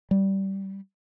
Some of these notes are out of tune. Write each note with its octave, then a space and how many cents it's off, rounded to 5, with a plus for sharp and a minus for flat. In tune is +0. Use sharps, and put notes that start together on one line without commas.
G3 -15